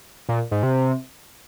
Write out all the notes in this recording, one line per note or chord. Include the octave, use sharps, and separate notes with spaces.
A#2
G#2
C3